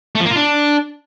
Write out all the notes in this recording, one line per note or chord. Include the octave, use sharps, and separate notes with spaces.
A3
F3
A#3
F4
D4